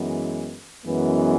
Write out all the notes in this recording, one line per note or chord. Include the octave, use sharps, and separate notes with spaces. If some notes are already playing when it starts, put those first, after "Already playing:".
Already playing: F#2 E3 G#3 B3
F#2 E3 G#3 B3